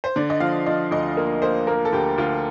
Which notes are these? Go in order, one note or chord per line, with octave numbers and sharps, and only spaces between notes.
C5
D3 D5
D#5
F3 F5
F3 D#5
D2 D#5
A#3
A#3 C5
A#3 A#4
A4
D2 G4
D2 F4